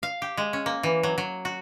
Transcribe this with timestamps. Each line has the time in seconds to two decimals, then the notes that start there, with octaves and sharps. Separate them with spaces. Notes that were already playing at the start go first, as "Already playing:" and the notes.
0.03 F5
0.22 G4
0.37 G#3
0.53 C#4
0.66 A#3
0.83 E3
1.03 F#3
1.18 F#3
1.45 F#4